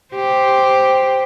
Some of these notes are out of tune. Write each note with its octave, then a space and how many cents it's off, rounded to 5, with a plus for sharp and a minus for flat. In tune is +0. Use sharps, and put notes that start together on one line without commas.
G4 +0 C5 +0